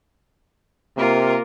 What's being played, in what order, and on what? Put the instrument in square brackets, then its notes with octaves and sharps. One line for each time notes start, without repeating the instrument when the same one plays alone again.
[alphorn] C3 [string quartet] A#3 F4 A#4